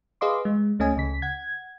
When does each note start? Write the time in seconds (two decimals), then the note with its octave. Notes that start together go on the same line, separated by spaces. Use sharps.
0.21 G#4 B4 D#5 F5 C6 D6
0.45 G#3
0.79 C#2 A3 C#4 D#5 G#5
0.97 C#2 C#3 B6
1.22 F#5 G#6